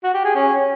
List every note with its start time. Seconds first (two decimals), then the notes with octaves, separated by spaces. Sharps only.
0.04 F#4
0.14 G4
0.25 G#4
0.35 C#4